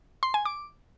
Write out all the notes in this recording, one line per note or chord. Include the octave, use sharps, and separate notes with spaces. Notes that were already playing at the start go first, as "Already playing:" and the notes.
C6
G#5
D6